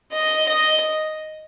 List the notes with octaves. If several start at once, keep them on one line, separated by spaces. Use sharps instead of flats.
D#5
D#5